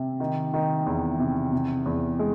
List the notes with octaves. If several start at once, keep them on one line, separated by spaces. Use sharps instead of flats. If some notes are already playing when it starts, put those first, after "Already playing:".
Already playing: C3
D#3
D#3
E2
C3
C3
E2
G#3